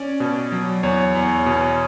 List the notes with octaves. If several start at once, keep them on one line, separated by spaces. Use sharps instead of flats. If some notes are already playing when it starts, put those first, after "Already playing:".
Already playing: C#4 D5
B2
F#3
E2 C#5
E2
B2